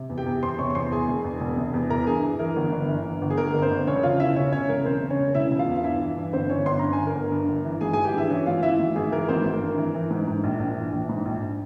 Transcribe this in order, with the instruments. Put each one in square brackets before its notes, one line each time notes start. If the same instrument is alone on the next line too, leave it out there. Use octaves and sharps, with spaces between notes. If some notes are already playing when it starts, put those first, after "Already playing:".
Already playing: [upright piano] C3
E2
G4 G5
E2
E2 C5 C6
C3 C#5 C#6
C#6
E2 C5 C6
E3 G#4 G#5
E1
E2
E1
C3
E2
E3 A#4 A#5
G2 G#4 G#5
E3
E3 A#4
G1
G1
E3
G1
G1
G#4
G1 A#4
G1
C4 C5
G1
E1 C#4 C#5
C#3 F4 F5
E1 E4 E5
C#3 C#4 C#5
C#3 C#4 C#5
E1 A#4
E1 C4 C5
C#3
C#4 C#5
E1
E1 E4 E5
E1
F4 F5
E2
F5
G2 E4 E5
E3
G2
G1 C4 C5
G1 C#4 C#5
G1 C6
G2 A#5
G#5
G1
A#4 A#5
G1
G2
G1
E3
G#1 G#4 G#5
E3 G#4 G#5
G4 G5
G2 E4 E5
E3 C#4 C#5
G#1 F4 F5
E3 E4 E5
G#1
G#1 G#4
E3 A#4
G#1 C4 C5
G#1
A#4
G2
E3
E3
G#2
G#2
A#1
A#1
E3
A#1
G#2
A#1